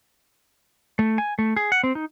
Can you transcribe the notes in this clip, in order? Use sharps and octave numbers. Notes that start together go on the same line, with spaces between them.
A3
G#5
A3
G#4
F#5
C4
D#4